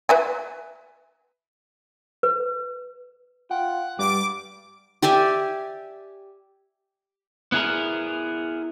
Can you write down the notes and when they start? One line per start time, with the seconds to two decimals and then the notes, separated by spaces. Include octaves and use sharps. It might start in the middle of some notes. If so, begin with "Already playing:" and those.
0.09 B4 E5 G#5
2.23 B4
3.51 F4 F#5 G5
3.99 G2 G3 G4 D5 D6
5.02 G4 D5 E5 G#5
7.52 B3 E4 G#4 A#4